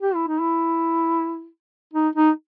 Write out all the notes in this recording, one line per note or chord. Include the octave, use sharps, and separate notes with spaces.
G4
E4
D#4
E4
D#4
D#4